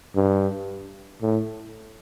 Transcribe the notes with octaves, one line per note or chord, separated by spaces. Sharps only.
G2
A2